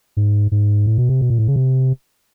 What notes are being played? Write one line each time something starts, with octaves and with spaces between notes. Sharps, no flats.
G#2
G#2
A2
B2
C3
B2
A#2
A2
C#3
C3